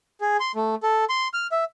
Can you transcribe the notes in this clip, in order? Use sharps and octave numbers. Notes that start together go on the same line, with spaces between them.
G#4
C6
A3
A4
C6
F6
E5